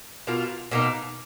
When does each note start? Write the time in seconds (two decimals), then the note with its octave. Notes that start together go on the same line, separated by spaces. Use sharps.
0.27 B2 A#3 F4
0.71 B2 A#3 D#4